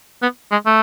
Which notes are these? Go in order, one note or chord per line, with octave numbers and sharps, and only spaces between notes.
B3
G#3
A3